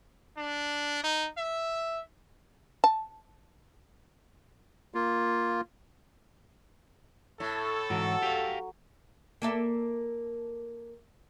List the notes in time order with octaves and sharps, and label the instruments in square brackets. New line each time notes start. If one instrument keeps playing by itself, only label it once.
[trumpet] D4
D#4
E5
[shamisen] A5
[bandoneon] A#3 F4
[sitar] A2 [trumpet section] A4
[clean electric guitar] G#2 E3 [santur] F#3
[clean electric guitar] G4 F5
[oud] A#3 A4 E5